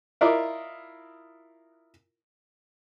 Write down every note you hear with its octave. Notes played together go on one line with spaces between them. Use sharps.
E4 F4 A#4 D5 D#5